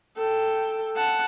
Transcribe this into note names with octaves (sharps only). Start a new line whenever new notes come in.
A4 G5
F#5 A5